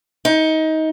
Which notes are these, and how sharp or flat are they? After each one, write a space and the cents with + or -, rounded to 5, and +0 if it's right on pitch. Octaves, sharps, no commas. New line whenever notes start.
D#4 +25